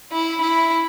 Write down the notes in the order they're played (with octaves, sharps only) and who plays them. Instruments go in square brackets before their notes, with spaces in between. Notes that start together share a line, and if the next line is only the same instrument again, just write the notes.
[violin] E4
E4